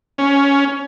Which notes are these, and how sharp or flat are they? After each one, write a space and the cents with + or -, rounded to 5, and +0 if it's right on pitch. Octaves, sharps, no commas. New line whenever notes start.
C#4 +10